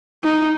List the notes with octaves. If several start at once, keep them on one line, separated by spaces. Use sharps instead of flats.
D#4